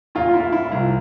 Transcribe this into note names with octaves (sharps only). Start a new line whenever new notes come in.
A#2 F4
E4
F4
E4
F4
C2